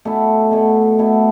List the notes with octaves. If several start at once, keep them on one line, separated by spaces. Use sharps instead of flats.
B2 A3 E4
B2 A3 E4
B2 A3 E4